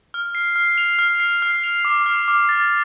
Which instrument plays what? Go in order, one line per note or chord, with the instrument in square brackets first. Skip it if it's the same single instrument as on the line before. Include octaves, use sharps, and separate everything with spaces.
[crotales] F6
C7
F6
F7
F6
C7
F6
F7
D6
F6
D6
A6